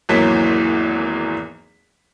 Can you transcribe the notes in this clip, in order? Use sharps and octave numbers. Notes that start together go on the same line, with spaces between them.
G#1 E2 E3 F#3 A#3 B6